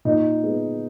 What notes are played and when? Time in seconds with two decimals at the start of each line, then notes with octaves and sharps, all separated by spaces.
0.05 A#2 D#4
0.42 G#3 B3